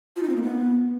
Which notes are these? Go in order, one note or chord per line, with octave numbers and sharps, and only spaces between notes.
F4
D#4
C4
A#3
B3